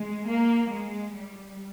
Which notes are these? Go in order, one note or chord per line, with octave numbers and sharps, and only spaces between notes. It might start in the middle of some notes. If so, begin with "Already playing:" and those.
Already playing: G#3
A#3
G#3
G3